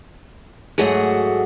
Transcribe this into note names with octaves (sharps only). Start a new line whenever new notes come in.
G#2 F#3 A3 F#4 G#4